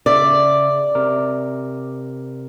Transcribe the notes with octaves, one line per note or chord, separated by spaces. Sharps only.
C#3 D5 E5
C3 A#4